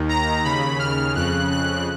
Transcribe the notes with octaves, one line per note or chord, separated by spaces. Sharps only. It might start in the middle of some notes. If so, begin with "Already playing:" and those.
Already playing: D#2 D#3
A#5
D#2 C#3 B5
F6
F2 C#3 F#6
F#6